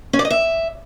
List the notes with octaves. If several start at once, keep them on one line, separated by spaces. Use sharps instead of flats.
C#4
D5
D#5
E5